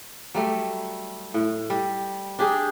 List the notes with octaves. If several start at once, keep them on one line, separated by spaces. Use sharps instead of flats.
F#3 G3 A3
A2
G3
D4 G4 G#4